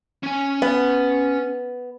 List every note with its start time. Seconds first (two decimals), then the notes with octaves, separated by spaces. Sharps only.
0.23 C#4 G#5
0.62 B3